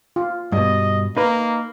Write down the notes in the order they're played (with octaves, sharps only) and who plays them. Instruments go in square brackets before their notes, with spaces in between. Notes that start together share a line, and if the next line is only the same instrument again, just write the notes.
[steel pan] F4
[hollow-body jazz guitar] G2 B2 [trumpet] D#5
[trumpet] A#3 [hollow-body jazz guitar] D#4 B4